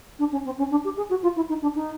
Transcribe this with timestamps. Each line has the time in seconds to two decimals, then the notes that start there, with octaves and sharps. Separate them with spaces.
0.19 D4
0.32 C#4
0.45 C4
0.58 C#4
0.71 D4
0.84 G4
0.97 G#4
1.10 F#4
1.23 F4
1.36 E4
1.49 D#4
1.62 D4
1.75 D#4